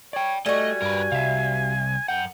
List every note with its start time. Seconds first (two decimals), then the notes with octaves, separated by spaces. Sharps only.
0.13 C#5 D5 G5
0.46 G3 A3 F#4 D#5 G#5
0.82 G2 A#4 B4
1.12 C2 E5 F5
2.08 F#2 F#5 G5